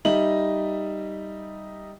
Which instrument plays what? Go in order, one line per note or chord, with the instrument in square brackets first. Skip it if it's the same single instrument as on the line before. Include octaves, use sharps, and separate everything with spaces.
[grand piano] G3 D#4 D#5 E5 F#7